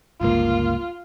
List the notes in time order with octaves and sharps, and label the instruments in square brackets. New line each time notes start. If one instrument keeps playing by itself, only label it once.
[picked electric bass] G1 C#2 A#3 [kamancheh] F4